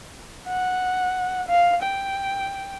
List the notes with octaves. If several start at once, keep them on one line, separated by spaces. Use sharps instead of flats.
F#5
F5
G5